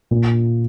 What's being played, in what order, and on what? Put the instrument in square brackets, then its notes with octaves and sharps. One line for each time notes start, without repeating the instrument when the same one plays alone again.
[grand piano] A#2